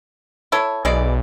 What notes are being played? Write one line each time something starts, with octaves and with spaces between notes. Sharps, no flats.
E4 A4 C#5
B1 E3 G#3 D5